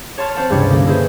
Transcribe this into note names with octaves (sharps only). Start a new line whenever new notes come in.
C#5 A5 C6 F6 G#6
C4 C5 F#5 A5
C#2 G2 C3 G3 E4 C#5
D3 A#3 C#4
E4 G#4 B4 C5